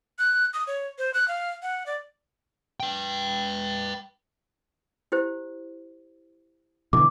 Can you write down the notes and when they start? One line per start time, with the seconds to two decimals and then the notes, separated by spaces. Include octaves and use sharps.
0.19 F#6
0.54 D#6
0.67 C#5
0.98 C5
1.14 F#6
1.28 F5
1.62 F#5
1.86 D5
2.80 B4 G5
5.12 E4 G4 C5
6.93 B2 D3 E3 D6